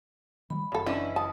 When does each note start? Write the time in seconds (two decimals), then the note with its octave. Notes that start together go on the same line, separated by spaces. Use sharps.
0.50 D#3 F#3 G3 B5
0.72 F#1 C#3 A4
0.86 D3 E3 C#4 E4 D#5
1.16 A5 D#6